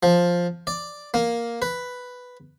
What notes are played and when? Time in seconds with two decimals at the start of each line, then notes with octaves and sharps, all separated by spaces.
0.03 F3
0.67 D5
1.14 A#3
1.62 B4